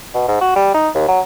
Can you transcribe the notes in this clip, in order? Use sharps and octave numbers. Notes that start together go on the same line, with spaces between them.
B2
G#2
F#4
G3
D#4
D#2
F#3